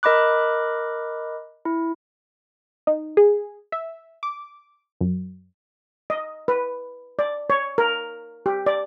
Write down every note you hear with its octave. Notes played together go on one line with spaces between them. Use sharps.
A#4 D#5 B5 D6 F#6
E4
D#4
G#4
E5
D6
F#2
D#5
B4
D5
C#5
A#4
G4
D5